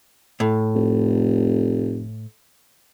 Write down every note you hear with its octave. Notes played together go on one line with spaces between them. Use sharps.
A2
F1